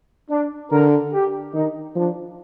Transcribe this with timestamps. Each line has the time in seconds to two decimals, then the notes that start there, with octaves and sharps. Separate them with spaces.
0.30 D4
0.71 D3 A#4
1.13 G4
1.54 D#3 D#4
1.95 F3 D4